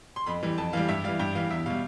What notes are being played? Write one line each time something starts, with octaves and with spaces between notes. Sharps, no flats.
C6
F2 B5
E3 G3
F2 A5
E3 G3 F5
G2 E5
E3 G3 F5
G2 G5
E3 G3 F5
E2 E5
B2 G3 F5